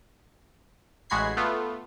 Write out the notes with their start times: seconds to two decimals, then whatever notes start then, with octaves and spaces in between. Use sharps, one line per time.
1.10 A1 G#3 F#4 B5 G#6 C7
1.37 A3 B3 F4